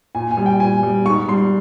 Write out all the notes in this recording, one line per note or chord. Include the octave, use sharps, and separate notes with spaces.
A#2 G#5
G#5
G3
G5
A#2 G#5
G3
G#2 C#6
G3 C6